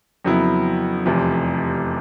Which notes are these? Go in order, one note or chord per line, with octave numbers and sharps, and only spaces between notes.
F2 C#3 F#3 B3 E4
F1 E2 C3 F3